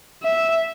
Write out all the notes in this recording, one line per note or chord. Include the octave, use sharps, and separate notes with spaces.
E5